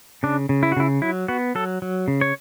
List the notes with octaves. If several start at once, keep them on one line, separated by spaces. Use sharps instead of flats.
C#3 D4
C#3
E4
F#4
C#3 E4
F#3 E4
B3 F#4
F#3 A4
F#3
C#3
C#5